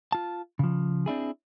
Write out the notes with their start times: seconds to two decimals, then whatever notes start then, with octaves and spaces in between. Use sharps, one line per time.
0.12 F4 A5
0.59 C#3 F3
1.06 C4 D4 E4 G#4